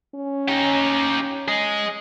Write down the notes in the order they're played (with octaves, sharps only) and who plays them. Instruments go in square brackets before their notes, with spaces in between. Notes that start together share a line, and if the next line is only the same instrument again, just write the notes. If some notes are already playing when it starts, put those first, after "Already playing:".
[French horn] C#4
[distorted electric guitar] D#4 G4
G#4 D#5